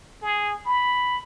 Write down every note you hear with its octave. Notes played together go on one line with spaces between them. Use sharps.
G#4
B5